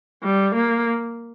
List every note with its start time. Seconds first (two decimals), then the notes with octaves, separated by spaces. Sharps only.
0.23 G3
0.55 A#3